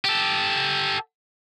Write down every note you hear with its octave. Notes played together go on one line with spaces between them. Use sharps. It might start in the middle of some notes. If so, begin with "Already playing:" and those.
G4 A4